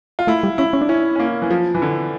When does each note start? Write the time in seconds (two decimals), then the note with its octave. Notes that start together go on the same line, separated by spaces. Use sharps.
0.19 F4
0.27 A3 E4
0.43 G3
0.58 C#4 E4
0.73 C#4
0.81 D4
0.89 C#4 E4
1.16 C#4
1.20 A#3
1.42 E3
1.51 F3
1.75 E3
1.82 D3